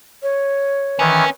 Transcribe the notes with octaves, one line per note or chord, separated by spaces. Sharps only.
C#5
D#3 E3 C#4